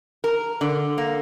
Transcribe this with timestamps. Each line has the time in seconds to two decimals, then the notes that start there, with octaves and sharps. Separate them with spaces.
0.24 A#4
0.61 D3
0.98 A#3